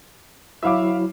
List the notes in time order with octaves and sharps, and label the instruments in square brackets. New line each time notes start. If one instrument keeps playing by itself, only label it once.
[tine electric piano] F#3 E4 F#4 [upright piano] E5 F5 D6